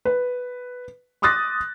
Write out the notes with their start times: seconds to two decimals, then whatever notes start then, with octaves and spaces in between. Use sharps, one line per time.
0.05 B4
1.22 C6 D6 D#6 F#6 A6 A#6